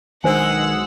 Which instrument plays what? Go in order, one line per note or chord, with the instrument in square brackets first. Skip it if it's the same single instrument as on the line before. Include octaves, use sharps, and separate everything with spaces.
[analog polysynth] B1 G#3 E6 [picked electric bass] D#3 [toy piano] D4 C5 G#5 [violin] F#5